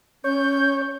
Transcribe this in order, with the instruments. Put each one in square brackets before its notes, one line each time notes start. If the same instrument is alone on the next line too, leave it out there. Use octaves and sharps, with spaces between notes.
[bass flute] C#4 [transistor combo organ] C#5 [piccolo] G6